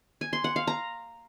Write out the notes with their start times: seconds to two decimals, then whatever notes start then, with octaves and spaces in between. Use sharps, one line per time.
0.21 G#5
0.33 C6
0.44 F#5
0.56 F5
0.67 A#5